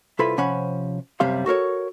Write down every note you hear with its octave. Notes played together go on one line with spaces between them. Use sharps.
C2 E4 F4 A4 B4 B5
C3 F3 C#4 F#5 B5
F#2 C3 G3 F5 C6
F#4 A4 A#4 C#5